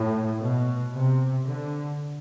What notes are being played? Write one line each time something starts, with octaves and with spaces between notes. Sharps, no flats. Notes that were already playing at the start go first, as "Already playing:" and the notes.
Already playing: A2
B2
C3
D3